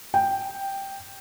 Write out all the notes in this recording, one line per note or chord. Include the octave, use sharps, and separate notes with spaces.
G5